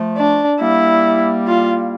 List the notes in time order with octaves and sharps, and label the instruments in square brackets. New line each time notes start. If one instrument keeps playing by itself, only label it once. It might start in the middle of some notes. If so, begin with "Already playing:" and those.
Already playing: [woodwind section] F3 A3
[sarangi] D4
[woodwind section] G3 A#3 [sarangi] E4
[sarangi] F4